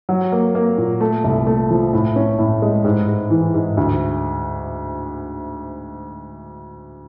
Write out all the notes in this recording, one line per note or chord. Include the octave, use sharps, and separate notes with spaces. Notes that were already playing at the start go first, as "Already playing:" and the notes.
F#3
A#3
A#3
A#2
A3
C2
A3
F3
A2
C#4
A2
G#3
G#2
G#2
E3
G#2
D2